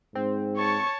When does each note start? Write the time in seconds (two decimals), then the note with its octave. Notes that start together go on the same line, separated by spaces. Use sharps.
0.15 G#2 C4
0.57 C#5 A5 C#6